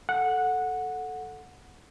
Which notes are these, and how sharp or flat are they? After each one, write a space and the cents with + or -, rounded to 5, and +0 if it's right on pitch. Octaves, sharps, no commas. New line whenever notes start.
A4 +0 F#5 -15